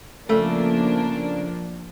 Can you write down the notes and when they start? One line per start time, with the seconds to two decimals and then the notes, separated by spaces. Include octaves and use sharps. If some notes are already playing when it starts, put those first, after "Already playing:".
0.29 C#3 F3 A3 A#3 D4